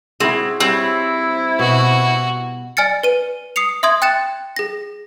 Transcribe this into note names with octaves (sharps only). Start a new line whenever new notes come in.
C4 E4 F#4 G#4
G3 C4 E4 C#5
B2 F#4
D5 G#5 F6 A6 C#7
B4 D#7
D#6 C7 C#7 F7
E5 C6 D#6 G#6
G5 F#6 A6 C#7 E7
G#4 A#6